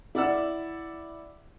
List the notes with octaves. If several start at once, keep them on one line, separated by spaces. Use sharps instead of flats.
E4 D5 F#5 E6